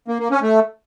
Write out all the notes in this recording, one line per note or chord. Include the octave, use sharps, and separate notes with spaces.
A#3
A#3
C#4
A3